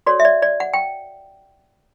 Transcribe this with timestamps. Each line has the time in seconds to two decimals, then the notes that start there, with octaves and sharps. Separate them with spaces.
0.06 F#4 A4 C#5 D5
0.20 E5
0.25 D5
0.42 D5
0.60 F#5
0.73 G5